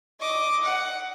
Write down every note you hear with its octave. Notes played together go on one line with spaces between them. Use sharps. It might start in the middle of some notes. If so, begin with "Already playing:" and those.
D#5 D6
F#5